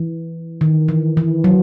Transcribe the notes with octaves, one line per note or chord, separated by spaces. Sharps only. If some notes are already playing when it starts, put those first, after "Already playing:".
Already playing: E3
D#3
E3
E3
F#3